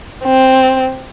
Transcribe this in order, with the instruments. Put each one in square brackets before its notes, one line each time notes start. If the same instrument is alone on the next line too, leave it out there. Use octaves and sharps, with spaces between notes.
[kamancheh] C4